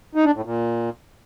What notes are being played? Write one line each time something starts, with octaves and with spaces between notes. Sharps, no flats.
D#4
D4
A2
A#2